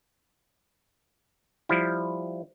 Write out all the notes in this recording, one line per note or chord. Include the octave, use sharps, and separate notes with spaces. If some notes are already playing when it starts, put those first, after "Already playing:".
F3 G3 E4